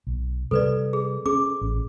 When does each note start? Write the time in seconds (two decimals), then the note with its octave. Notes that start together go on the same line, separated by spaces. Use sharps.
0.07 B1
0.51 C3 G3 A4 B4 D5
0.93 G#4
1.26 C#4 G#4 D6
1.61 A1